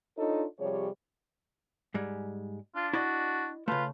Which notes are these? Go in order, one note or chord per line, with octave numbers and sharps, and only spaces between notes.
D4 D#4 F4 A4 C#5 D#5
C3 F3 G3 G#4 C#5
G#2 G3 G#3
D4 F4
E4 F#4 D5 D#5
C#3 A3 F4 B4